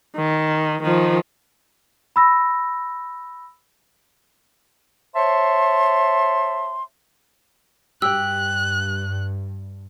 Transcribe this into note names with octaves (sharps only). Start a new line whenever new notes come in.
D#3
D#3 F3
B5 E6 A#6
C5 C#5 E5 A5 C6
G2 G4 G5 E6 F#6